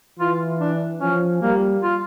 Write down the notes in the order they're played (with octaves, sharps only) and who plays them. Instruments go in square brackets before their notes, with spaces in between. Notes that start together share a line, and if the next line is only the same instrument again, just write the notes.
[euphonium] E3 [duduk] F4
[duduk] D4
[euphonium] F3 [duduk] C#4
[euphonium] G3 [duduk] A#3
[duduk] F4